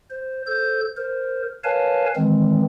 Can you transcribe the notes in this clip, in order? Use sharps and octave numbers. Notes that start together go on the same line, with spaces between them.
C5
A4 C5 G6
A#4 C5
A#4 B4 C#5 F5 G#5 A5
D#3 E3 G#3 C4